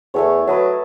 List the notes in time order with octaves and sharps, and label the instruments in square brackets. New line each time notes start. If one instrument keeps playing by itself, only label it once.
[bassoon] E2 [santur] A3 A4 C#5
[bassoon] F#3 [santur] B4 D#5 A5